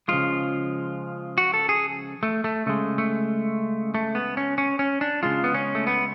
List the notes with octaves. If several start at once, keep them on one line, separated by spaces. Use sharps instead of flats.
C#3 F3 G#3 F4
F#4
A4
G#4
A3
A3
C#3 G#3 A3
A3
A3
B3
C#4
C#4
C#4
D4
C#3 G#3 F4
B3
C#4
A3
B3